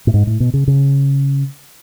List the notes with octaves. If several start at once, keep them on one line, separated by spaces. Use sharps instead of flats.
A2
G#2
A2
B2
C#3
C#3